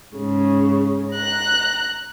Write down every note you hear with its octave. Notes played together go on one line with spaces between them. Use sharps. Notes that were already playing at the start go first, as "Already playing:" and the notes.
G#2 C#3
A#5 F#6